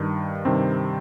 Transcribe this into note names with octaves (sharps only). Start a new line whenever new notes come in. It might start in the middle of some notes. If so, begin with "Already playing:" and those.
Already playing: G2 D#3
G2 C3 D#3 C4